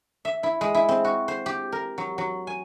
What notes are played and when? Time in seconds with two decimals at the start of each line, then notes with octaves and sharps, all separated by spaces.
0.25 E5
0.43 E4
0.61 G#3
0.75 E4
0.89 C4
1.05 F#4
1.28 C5
1.46 G4
1.72 A#4
1.98 F#3
2.18 F#3
2.47 G#5